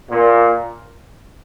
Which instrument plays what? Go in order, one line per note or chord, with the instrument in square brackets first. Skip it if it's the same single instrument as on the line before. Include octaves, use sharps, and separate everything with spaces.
[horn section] A#2